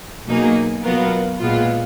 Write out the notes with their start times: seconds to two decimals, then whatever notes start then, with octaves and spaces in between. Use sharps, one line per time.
0.26 B2 F#3 A#3 D#4 G#4
0.83 B2 F#3 B3 F4 A#4
1.40 A#2 G#3 B3 F4